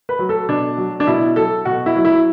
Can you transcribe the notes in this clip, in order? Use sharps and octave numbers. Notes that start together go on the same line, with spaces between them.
B4
F#3
A4
B2 D4
F#3
D4
B2 E4
F#3 A4
B2 F#4
E4
F#3
E4